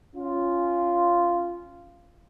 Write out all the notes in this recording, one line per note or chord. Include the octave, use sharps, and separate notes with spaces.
C#4 F4